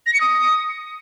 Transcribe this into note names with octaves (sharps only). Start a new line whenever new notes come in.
A#6
C#7
D#6